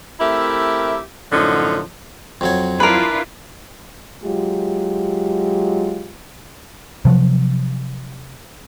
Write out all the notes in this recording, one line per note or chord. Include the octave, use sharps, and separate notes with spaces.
A3 C4 E4 G4 A#4 E5
F#2 A2 D3 F3 C#4 D#4
F2 F#3 C#5
D4 E4 F4 A#4 B4
F#3 G#3 F4 G4
C3 F3 F#3